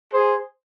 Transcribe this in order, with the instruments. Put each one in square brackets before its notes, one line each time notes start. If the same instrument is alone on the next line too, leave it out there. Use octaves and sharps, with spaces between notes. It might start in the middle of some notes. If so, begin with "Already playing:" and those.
[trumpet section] G#4 C5